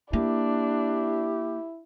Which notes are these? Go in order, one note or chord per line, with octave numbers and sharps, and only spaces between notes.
A#3 D4 E4 G4